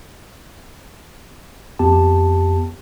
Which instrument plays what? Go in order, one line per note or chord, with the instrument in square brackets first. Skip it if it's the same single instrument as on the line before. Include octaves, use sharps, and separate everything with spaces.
[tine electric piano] F2 B3 G4 A5